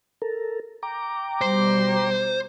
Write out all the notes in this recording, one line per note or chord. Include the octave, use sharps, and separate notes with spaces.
A4 A#4
G5 A#5 D6
B2 G3 C5